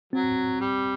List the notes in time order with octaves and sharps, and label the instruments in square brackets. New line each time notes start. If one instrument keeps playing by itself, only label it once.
[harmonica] F#3 [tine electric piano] C4
[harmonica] G3